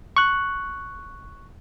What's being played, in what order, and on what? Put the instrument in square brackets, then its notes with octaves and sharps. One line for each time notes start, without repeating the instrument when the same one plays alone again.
[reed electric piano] C#6 F#6